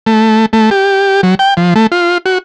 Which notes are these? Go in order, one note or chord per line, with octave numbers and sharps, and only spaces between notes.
A3
A3
G4
F#3
G5
F3
A3
F4
F#4